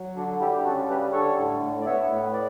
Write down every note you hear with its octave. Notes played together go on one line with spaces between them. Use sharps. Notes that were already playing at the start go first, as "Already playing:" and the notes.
Already playing: F#3
D3 D4 F#4
G3 E4 G4
G4
C#3 F#4 A4
G3 G4 B4
D3 A4 C#5
A2
A2
D5
B3 C#5 E5
A2
D5